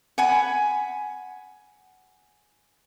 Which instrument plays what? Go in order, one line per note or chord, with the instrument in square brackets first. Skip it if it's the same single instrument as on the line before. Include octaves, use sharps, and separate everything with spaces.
[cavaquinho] F#5 G#5 B5